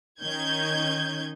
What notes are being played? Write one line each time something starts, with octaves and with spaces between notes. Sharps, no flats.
D#3 C#4 G6 G#6